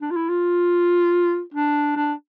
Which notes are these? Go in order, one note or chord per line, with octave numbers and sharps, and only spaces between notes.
D4
F4
E4
F4
D4
D4